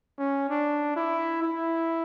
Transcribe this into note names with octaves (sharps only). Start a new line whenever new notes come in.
C#4
D4
E4
E4